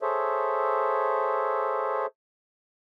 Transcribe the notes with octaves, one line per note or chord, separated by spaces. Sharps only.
G#4 A4 C5 C#5 E5